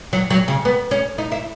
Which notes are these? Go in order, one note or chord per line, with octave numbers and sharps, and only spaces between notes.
F#3
F#3
C#3
B3
C#4
D#4
E4